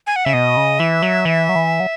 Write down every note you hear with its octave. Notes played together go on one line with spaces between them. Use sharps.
G#5
F#5
C#3 E5
B2 D#5
C#3
E3 E5
F#3
E3
F#3
E3
F#3